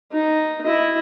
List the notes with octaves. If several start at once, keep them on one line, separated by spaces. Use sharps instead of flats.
D#4
E4 D#5